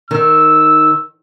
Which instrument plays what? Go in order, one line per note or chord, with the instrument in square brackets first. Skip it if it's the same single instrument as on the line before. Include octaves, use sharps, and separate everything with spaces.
[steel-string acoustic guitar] D#3 [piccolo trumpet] E6